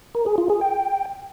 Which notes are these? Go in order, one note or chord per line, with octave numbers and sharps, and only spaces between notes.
A#4
G#4
F4
G#4
G5